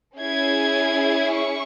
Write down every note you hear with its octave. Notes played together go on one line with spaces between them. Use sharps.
C#4 E4 G#4 G#6
C#6